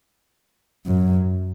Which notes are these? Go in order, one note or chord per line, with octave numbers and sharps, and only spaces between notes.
F#2